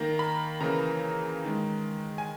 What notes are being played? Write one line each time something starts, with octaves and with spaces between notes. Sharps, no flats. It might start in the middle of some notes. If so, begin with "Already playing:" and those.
Already playing: D#3 A#3 A#5
B5
C#3 E3 A#3 A#5
D#3 G#3
G#5